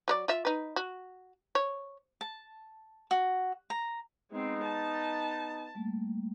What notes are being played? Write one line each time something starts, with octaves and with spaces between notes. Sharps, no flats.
F#3 A#4 D5
F4 E5
D#4 B4
F#4
C#5
A5
F#4
A#5
G#3 B3 C4 D#4
A5
G3 A3 A#3